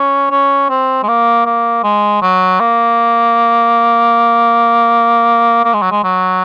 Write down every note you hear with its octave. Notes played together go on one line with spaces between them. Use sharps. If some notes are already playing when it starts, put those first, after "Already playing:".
Already playing: C#4
C#4
C4
G#3
A#3
A#3
G#3
F#3
A#3
A#3
G#3
F#3
G#3
F#3